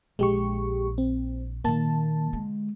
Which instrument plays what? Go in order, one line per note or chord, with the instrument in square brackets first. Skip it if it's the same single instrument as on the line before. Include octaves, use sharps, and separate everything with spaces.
[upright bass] A#1 [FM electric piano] G#3 G4 C#6
[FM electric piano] C4
[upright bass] A#2 D#3 [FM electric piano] A#3 A5
[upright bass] D3 G#3